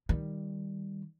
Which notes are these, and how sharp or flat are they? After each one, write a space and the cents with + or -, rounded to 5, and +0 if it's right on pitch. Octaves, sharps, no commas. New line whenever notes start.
D#3 +0 G3 +5